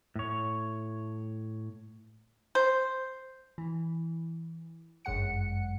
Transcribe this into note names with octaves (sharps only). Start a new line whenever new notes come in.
A2 C#5
C5
E3
G1 F#2 G#3 F#5 C#7